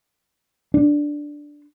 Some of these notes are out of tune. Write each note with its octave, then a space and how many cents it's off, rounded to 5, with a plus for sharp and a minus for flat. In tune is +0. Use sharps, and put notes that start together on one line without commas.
D4 +0